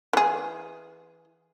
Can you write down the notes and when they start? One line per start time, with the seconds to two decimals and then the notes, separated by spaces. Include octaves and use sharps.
0.13 E3 G#4